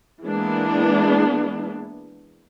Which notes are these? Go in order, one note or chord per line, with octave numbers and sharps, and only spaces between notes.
E3 G#3 A#3 B3 D4 E4